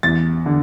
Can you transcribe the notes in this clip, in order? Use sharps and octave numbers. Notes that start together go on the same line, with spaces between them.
E2 A6
D3